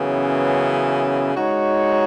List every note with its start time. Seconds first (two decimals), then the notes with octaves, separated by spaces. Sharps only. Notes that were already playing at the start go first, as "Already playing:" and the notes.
Already playing: F#2 C#3 E3 B3
1.33 G#3 D#4 F#4 C#5